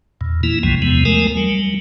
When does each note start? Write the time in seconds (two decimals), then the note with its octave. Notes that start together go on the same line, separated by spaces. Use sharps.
0.21 E2 A#2
0.43 E3 A#3 E4
0.63 C2 F#2 C3 E3 F3 G#3
0.82 E2 C3 F3 G#3 B3
1.05 D#2 F3 G#3 A3 A#4 G#5
1.37 F#3 G3